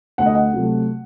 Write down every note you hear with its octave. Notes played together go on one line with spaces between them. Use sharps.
D2 F#5
D#5
F#5
C3 F#3 A3